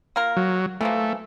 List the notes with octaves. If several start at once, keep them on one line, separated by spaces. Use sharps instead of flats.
A#3 F4 A#4
F#3
E3 F3 A3 A#3